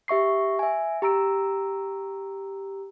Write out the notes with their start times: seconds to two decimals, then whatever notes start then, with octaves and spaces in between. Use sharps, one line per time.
0.08 G4 E5 C#6 C7
0.59 E5 G#5
1.02 G4 A#5 E6 D7